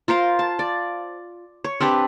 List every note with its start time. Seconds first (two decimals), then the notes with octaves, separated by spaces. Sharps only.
0.08 F4 A#4 C5 F5
0.39 A5
0.59 D5
1.64 C#5
1.80 C4 D4 G4 B4